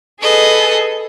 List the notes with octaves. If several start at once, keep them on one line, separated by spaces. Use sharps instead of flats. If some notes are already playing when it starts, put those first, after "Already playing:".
G#4 A4 B4 D#5